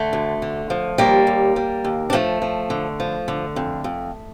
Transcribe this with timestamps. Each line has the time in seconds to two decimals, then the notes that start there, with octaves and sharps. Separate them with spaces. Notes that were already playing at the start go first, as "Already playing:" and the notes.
Already playing: D3 A3
0.13 D2
0.42 D3
0.70 F3
0.98 D#2 G3 A#3
1.27 D#2
1.56 G3
1.85 D#2
2.10 D4
2.13 F3 A3 C4
2.42 F3
2.70 D3
3.00 F3
3.28 D3
3.56 F2
3.84 F2